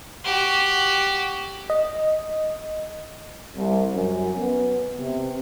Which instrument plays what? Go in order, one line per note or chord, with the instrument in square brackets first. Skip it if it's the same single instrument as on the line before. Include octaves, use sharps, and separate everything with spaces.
[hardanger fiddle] F#4 G4
[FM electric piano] D#5
[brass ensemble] C2
F#2
B3
C3